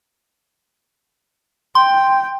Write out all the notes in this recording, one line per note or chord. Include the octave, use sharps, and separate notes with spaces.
G5 C6